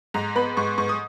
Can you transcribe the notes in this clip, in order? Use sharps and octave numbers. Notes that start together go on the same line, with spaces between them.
G#2 A#5
B3 B5
G#2 C#6
G#2 C#6
D#6